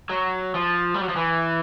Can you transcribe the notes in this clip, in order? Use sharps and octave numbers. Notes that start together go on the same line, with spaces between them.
F#3
F3
G3
F#3
F3
E3